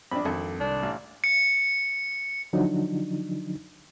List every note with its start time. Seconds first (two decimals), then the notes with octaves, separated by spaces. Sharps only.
0.11 A#1 C4 D4 B5
0.25 G#1 F2 A4
0.60 C2 D4
0.83 A1
1.24 C#7
2.53 D3 F3 F#3 D4 D#4